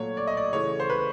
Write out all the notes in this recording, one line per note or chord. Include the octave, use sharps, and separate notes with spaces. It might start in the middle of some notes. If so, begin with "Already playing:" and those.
Already playing: A#2 F#3 A3 C#5
D5
D#5
D5
C#3 E3 A3 C#5
C5
B4